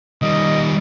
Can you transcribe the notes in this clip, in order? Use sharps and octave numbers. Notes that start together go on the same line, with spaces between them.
D#3 G3 D#5